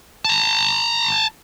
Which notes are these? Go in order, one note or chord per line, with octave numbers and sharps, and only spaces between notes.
A5 A#5